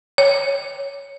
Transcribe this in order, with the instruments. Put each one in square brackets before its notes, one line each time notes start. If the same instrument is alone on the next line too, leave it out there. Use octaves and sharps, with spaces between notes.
[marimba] C#5